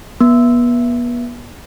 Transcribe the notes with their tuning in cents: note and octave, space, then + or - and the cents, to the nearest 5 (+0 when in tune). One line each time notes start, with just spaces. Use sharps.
B3 -35